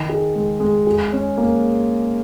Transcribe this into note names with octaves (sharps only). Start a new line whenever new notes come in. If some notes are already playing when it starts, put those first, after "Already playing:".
Already playing: D#3 D#4
G#4
G#3
G#3
G#4
C#4
A#3